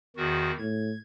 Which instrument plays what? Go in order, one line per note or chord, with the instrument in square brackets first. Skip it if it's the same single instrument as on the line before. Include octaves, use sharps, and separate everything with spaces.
[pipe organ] E2 D#3 F#4
[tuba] A2 [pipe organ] G#6